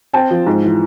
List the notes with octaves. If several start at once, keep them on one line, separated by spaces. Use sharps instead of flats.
C4 G5 A5
F3
G#2
E3